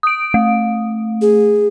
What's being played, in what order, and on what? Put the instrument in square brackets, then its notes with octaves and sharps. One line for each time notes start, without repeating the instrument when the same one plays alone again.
[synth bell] D#6 D7
A3
[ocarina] G#4